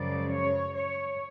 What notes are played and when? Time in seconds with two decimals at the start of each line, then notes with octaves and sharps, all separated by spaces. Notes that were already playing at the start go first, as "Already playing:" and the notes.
Already playing: F#2 C#3 F3 G#3 D5
0.30 C#5
0.73 C#5